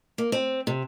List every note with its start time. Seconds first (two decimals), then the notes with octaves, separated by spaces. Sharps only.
0.18 A#3
0.32 C4
0.67 C3